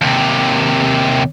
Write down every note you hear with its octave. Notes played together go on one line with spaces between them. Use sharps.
D#2 C3